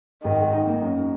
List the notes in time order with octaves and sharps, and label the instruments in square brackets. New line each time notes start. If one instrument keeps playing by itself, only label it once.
[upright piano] G#1 [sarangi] D#3
[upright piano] G#3
D#4
A#3
F#2